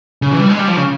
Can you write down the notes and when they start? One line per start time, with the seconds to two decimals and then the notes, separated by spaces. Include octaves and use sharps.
0.22 C#3
0.31 E3
0.39 G3
0.49 G#3
0.59 G3
0.68 F3
0.77 C#3